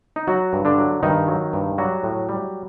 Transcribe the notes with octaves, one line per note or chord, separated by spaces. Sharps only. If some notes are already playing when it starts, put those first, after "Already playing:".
D#4
F#3 F#4
G2
D3 D4
F#3
G2 D#3 D#4
F#3
G2
F#3 G3 F#4
A2
G3